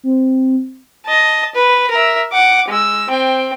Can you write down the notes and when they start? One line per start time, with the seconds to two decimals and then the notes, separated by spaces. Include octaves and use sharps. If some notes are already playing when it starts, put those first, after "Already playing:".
0.03 C4
1.06 D#5 A5
1.55 B4
1.91 A#4 E5
2.32 F#5 D6
2.68 G#3 E6
3.09 C4 G5